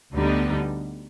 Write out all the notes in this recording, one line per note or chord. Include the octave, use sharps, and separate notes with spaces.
D2 D3 G3 B3 D#4